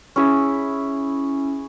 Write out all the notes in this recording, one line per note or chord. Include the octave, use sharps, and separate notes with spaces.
C#4 E4 G#4